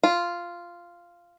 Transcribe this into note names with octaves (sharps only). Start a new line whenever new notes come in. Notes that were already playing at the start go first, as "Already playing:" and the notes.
F4